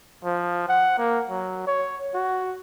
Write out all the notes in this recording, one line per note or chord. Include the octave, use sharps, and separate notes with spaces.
F3
F#5
A#3
F#3
C#5
F#4